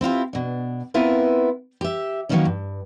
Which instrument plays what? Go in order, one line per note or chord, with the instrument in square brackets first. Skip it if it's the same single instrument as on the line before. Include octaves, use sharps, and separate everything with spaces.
[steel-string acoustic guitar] C4 E4 F4 G4
B2 D4
B3 C4 E4 F4 A#4 B4
G4 E5
D#3 F#3 A#3 B3 C#4 D#4
G2